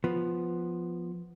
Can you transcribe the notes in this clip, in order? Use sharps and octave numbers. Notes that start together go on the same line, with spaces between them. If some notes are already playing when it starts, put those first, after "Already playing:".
F3 B3